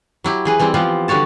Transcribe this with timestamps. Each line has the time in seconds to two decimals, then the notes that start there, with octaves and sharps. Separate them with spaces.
0.24 F#3 E4 G4
0.45 E3 G#4 B4
0.59 E3 G3 C4 E4
0.74 E3 F3 B3 C4 F4 G4
1.08 D3 G3 F#4 C#5 A5